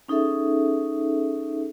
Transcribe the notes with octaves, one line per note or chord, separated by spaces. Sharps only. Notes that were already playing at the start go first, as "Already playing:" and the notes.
C#4 D#4 G#4 A4 E5